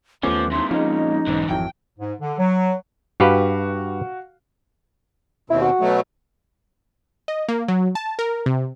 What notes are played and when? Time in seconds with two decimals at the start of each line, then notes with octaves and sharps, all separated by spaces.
0.23 D#2 F3 A3 B3 C#4 F4 D6
0.52 F2 A#2 D#4 E4 C6
0.71 F3 G#3 C#4 D#4 D#5
1.28 B1 G#2 D3 E3
1.49 G#1 F2 E3 F#3 G5
1.99 G#2
2.20 D3
2.38 F#3
3.20 G2 F#4 G4 B4 F5
5.50 D#2 B2 C4 E4
5.61 F#4
5.81 B2 F#3 A3
7.28 D#5
7.48 A#3
7.68 F#3
7.95 A5
8.19 A#4
8.46 C3